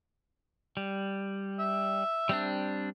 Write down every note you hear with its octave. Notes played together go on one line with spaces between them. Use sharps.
G3
E5
G3 C4 D4